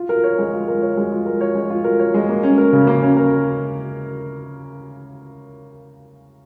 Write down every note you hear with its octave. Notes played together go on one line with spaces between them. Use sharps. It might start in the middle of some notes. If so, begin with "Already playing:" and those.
Already playing: F4
A#4
C#5
G#3
F4
A#4
C#5
G#3
F4
A#4
C#5
G#3
F4
A#4
C#5
G#3
A#3
C#4
A#4
C#3
A#3
C#4
A#4